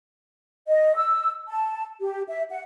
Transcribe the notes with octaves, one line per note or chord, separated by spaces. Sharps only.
D#5
E6
A5
G4
E5
F#5